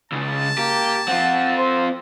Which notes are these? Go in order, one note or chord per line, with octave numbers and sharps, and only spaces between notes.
C#2 C#3 A5
A#3 G4
C4 F4 F#5
C5